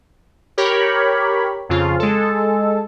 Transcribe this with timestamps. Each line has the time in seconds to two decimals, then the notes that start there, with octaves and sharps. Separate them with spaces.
0.58 G4 A#4 C#5 B5
1.69 F2 C#3 F4
2.00 G#3 A4